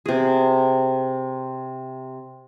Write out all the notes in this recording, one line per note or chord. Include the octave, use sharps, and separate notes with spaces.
C3 G#4